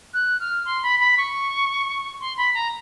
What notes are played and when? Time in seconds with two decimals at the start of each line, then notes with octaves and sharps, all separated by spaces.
0.14 F#6
0.40 F6
0.65 C6
0.83 B5
1.00 B5
1.18 C#6
2.20 C6
2.37 B5
2.54 A#5